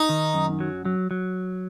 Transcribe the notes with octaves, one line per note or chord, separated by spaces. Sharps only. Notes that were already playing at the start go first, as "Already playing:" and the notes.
Already playing: D#4
D#3
F#2
F#3
F#3
F#3